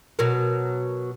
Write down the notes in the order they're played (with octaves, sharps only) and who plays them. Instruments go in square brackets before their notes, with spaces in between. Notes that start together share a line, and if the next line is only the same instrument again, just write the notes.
[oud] B2 F#3 A#4